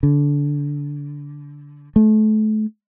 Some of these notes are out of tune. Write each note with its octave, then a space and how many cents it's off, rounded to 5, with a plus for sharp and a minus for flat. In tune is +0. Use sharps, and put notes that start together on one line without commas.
D3 -20
A3 -30